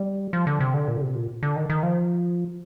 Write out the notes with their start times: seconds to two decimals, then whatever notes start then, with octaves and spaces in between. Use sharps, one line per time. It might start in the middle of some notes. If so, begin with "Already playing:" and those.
Already playing: G3
0.33 F3
0.47 D3
0.60 C3
0.74 D3
0.88 A#2
0.97 D3
1.01 C3
1.15 A#2
1.43 D3
1.56 D#3
1.70 D#3
1.83 F3